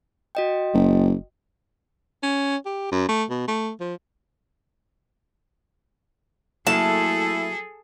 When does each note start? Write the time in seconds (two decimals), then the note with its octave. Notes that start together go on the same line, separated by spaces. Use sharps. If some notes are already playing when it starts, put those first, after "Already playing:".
0.35 F#4 D#5 G5
0.74 F#1
2.23 C#4
2.66 G4
2.92 F#2
3.09 A3
3.30 B2
3.48 A3
3.80 F3
6.67 F#3 A3 A#3 E4 G#4 A4 A5